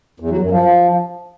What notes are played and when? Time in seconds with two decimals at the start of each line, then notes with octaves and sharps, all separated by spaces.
0.20 E2
0.30 F#3
0.41 F#2
0.51 F3